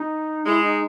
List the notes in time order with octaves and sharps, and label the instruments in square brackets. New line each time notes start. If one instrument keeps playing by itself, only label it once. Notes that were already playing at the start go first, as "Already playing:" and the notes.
Already playing: [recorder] D#4
[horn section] G#3 [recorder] E4
[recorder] D#4